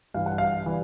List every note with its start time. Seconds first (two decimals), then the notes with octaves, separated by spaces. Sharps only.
0.14 G2 E3 G3 F5
0.26 F#5
0.38 F5
0.66 E3 G3